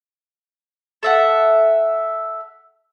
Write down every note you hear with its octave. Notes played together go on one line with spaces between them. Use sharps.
A4 E5 F#5